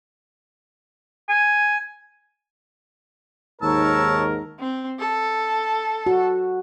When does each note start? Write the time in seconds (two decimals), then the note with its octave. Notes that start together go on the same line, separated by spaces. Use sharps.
1.29 G#5
3.62 D#2 G#2 A#4 C#5 A5 E6
4.60 C4
4.99 A4
6.07 F#4